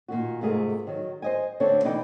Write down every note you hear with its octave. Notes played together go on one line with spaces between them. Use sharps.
A#2 D#3 F#4
F2 G#2 C3 A3 G#4 A#4
D#3 F#3
C5 D#5 G#5
D2 D3 C4 D4 C#5
B2 E3 D#4 B4 D5 G5